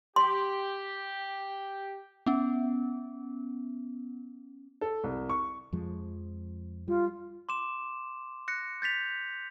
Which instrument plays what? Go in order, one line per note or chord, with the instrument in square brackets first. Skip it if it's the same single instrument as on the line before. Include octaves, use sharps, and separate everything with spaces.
[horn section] G4 [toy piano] C6
[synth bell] B3 C#4
[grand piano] A4
C2
C#6
[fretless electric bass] F2 F3 G#3
[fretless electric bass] G3 [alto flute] F4
[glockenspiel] C6 D6 E7
F#6 A#6 C#7
G6 A6 B6 F7